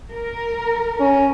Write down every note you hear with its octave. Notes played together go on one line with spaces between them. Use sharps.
A#4
C#4